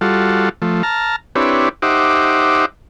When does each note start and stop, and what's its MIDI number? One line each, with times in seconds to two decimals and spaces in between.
0.01 0.49 55
0.01 0.49 65
0.01 0.49 66
0.01 0.49 69
0.62 0.82 53
0.62 0.82 57
0.83 1.16 81
0.83 1.16 82
0.83 1.16 89
1.35 1.69 60
1.35 1.69 62
1.35 1.69 64
1.35 1.69 67
1.35 1.69 71
1.35 1.69 73
1.82 2.65 63
1.82 2.65 67
1.82 2.65 72
1.82 2.65 76
1.82 2.65 78
1.82 2.65 86